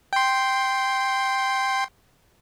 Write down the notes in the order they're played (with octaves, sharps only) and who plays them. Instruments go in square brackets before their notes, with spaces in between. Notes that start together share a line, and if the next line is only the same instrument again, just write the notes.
[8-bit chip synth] G5 C6